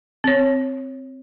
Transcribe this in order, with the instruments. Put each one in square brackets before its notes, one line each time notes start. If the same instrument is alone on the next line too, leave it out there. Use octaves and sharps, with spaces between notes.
[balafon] C4 C#5